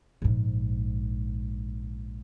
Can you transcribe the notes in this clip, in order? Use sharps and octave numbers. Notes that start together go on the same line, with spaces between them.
A#1 G#2